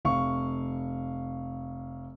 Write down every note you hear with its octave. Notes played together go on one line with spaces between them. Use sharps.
F1 F5 C#6